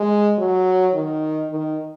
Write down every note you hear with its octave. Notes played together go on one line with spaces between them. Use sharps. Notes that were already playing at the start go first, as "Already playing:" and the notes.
Already playing: G#3
F#3
D#3
D#3